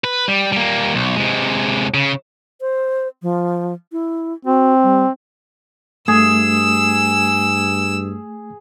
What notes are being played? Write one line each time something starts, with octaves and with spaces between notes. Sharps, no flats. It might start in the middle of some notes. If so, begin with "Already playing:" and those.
B4
G3
G3 A#3
B1
C3 G#3
C#3
C5
F3
E4
C4 F#4
G3
G2 A3 G#4 E6